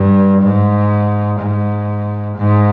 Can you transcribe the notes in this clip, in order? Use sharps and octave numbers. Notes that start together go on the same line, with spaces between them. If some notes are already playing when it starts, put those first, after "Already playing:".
Already playing: G2
G#2
G#2
G#2